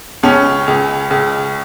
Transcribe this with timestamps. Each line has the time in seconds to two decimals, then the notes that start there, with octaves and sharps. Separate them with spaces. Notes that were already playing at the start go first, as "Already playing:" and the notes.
0.23 C#2 C#4
0.68 C#2
1.11 C#2